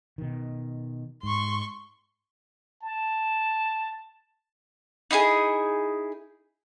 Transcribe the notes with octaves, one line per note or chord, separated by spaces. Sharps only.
B2 D#3
G#2 C6 C#6
A5
D#4 E4 F#4 G#4